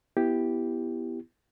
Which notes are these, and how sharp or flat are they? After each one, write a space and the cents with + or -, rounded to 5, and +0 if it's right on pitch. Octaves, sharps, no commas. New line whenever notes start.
B3 +0 E4 +10 G4 +0